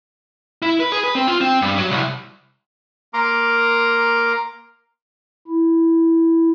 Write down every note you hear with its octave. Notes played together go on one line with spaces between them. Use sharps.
E4
B4
G#4
B4
C4
F4
C4
G2
F#3
C2
A#3 A#4 A#5 C6 D6
E4